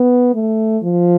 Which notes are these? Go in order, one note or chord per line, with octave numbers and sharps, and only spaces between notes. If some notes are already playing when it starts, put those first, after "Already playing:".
Already playing: B3
A3
F3